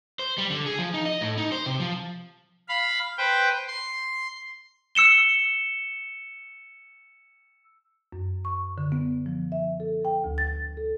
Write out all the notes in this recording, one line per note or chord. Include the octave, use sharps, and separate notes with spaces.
C5
G3
D3
G#4
F3
D#4
D#5
A2
D#4
C5
C3
F3
F5 B5
B4 C5 G5
C6
E6 C#7 E7 G7
F#2
C#6
D3
B3
F3
E5
A4
G5
D2
A6
A4